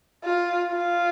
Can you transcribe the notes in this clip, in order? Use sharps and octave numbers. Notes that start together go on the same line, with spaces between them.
F4
F4